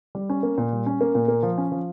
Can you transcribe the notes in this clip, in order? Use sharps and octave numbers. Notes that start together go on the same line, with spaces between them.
G3
C#4
A#3
A#2
G3
C#4
A#3
A#2
A#3
F3
C#4
F3